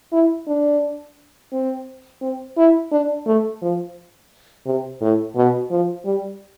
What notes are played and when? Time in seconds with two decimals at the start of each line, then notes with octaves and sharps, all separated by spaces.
0.13 E4
0.48 D4
1.53 C4
2.22 C4
2.57 E4
2.92 D4
3.26 A3
3.62 F3
4.66 C3
5.02 A2
5.36 B2
5.71 F3
6.05 G3